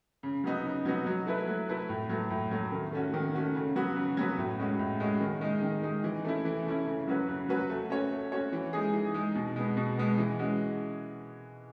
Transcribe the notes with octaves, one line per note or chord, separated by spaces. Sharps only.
C#3
F#3 B3 D#4 F#4
C#3
F#3 B3 D#4 F#4
F#3
A3 E4 B4
F#3
A3 E4 B4
A2
F#3 A3
A2
F#3 A3
D#3
A3 C#4 F#4
D#3
A3 C#4 F#4
C#3
F#3 B3 F#4 B4
C#3
F#3 B3 F#4 B4
A2
G#3 C#4 F#4
A2
G#3 C#4 F#4
D#3
G#3 D#4
D#3
G#3 D#4
E3
A3 C#4 E4
E3
A3 C#4 E4
C#3
F#3 C#4 F#4 B4
C#3
F#3 C#4 F#4 B4
A3
C#4 F#4 C#5
A3
C#4 F#4 C#5
E3
G#3 D#4 G#4
E3
G#3 D#4 G#4
B2
G#3 B3
B2
G#3 B3
E3
G#3 C#4 F#4